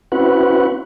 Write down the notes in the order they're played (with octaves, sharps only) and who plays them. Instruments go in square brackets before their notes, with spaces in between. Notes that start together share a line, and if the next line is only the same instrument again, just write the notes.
[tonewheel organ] C4 C#4 E4 F#4 B4 F#5